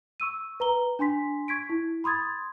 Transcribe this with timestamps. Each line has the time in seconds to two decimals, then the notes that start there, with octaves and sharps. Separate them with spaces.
0.20 C#6 E6 D#7
0.60 B4 A#5 G7
0.99 D4 G#5 C6 B6
1.48 C#6 G#6 B6 D7
1.70 E4
2.04 B5 C6 D#6 G#6 A6